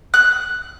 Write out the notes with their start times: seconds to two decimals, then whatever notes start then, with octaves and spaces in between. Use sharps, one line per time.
0.14 F#6